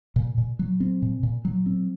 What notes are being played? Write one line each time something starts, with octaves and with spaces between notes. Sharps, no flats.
A#2
A#2
F#3
C4
A#2
A#2
F#3
C4